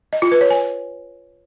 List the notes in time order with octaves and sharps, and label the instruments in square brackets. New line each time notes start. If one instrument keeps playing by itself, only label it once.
[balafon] D#5
F4
B4
C#5
G#5